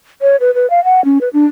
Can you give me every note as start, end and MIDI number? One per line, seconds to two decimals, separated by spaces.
0.21 0.36 73
0.40 0.54 71
0.54 0.69 71
0.70 0.83 77
0.84 1.04 78
1.05 1.18 61
1.21 1.29 71
1.33 1.45 62